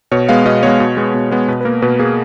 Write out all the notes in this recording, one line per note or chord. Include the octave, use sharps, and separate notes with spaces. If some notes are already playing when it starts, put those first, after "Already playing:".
B2 C#5
G#3 B3 F5
B2 D#5
G#3 B3 C#5
B2
G#3 B3
B2
G#3 B3
B2 B4
B4
A#3 A#4
B2 B4
A#3 G#4